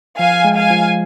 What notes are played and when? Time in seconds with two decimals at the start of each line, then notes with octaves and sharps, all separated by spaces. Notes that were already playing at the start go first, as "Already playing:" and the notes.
0.19 F3 F5 G#5
0.45 G#3
0.57 F5 G#5
0.70 F3